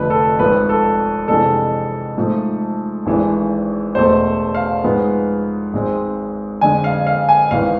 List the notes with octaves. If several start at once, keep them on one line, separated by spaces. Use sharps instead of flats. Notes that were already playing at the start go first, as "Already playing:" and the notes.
Already playing: F1 F2 D3 F3 A3 B4
A4
G#1 G#2 F3 B4
A4
F2 C3 E3 G#3 D4 A4
G#2 F3 A3
G#1 G#2 E3 G#3 D4
E1 E2 B2 A3 C5
F5
G#2 F3 G#3 B3
G#1 G#2 G#3 C4
F2 D3 G#3 D4 G#5
F5
F5
G#5
G#1 G#2 E3 B3 F5